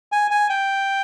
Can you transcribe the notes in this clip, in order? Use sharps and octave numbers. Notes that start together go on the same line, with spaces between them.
G#5
G#5
G5